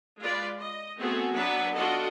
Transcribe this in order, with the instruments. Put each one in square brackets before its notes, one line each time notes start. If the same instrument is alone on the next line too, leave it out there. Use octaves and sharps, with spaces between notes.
[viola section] G#3 F4 B4 D5
D#5
A3 B3 C4 F#4 G#4 A4
F#3 B3 D4 B4 E5
D4 F4 F#4 A4 D#5